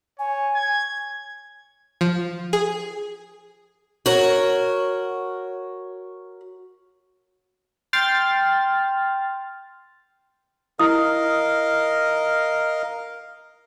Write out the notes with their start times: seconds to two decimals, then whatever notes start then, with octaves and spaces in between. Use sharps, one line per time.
0.19 C#5 G#5
0.55 G#6
2.01 F3
2.53 G#4
4.06 F#4 A#4 C#5
7.93 G5 C6 F6 A6
10.79 E4 A#4 D#5 F5 D#6